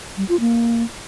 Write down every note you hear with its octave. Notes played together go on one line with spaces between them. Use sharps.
G3
F4
A#3